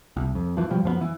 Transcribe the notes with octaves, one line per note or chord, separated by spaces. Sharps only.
C2
F2
F#2 E3 F3
B2 F3 G3
F#2 F3 G#3 B3
E3